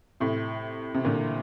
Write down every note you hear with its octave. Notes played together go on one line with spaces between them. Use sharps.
A2 C3
C3
A#2 D3